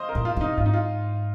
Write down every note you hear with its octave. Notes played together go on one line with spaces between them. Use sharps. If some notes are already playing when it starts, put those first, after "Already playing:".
Already playing: C5 D#5 F5
A#4
A#2
F4
C3 D#4
G#2 F4
D#4
F4